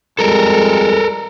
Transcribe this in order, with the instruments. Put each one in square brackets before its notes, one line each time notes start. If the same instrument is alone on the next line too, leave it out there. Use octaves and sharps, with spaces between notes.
[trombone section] F2 G3 G#3 [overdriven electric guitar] A4 A#4